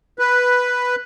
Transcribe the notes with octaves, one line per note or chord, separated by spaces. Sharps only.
B4